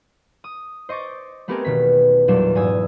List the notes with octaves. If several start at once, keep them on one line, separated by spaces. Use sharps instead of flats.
D#6
C5 D#5 C#6 D6 A6
A3 B3 C4 G4 G#4 A#4
E1 B2 D#3 B6
E2 A#2 F#3 G3 D4 E7
E1 G#2 G#5 D#6 E6